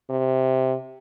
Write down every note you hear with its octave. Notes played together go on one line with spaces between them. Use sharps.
C3